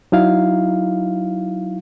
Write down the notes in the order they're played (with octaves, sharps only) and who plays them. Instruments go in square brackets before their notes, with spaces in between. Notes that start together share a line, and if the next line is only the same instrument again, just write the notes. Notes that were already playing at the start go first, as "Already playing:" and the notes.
[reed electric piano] F#3 D#4 E4 F5